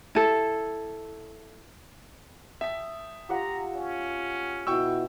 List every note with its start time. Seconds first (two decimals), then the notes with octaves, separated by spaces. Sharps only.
0.15 E4 A4
2.61 E5 G5 A5 D#6 B6
3.29 F4 G4 F#5 A#5
3.75 C#4
4.67 B2 E4 F#4 G5 C#6 E6